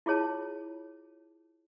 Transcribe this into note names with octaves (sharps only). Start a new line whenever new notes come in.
E4 F4 G#4 C#5 A5